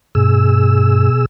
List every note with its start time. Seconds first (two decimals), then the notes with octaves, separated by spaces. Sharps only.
0.15 G2 B2 G#4 E6